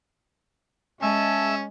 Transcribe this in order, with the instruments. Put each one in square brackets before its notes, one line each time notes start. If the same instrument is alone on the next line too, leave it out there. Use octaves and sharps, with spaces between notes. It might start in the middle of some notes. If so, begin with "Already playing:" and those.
[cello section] G#3 [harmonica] C#4 [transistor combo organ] E5 [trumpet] A5